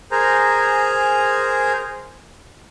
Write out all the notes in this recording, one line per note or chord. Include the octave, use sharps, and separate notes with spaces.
G#4 A#4 C5 G#5 A#5